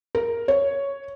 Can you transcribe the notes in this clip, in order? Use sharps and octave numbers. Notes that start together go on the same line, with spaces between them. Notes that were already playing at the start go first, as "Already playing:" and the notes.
A#4
C#5